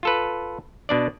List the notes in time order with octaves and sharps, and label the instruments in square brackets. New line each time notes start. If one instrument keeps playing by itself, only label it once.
[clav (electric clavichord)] F4 A4 B4
B2 D4 D5